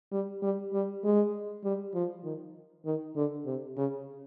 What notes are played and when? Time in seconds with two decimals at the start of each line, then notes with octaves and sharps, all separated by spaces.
0.12 G3
0.42 G3
0.73 G3
1.04 G#3
1.64 G3
1.94 F3
2.24 D#3
2.85 D#3
3.16 D3
3.46 C3
3.77 C#3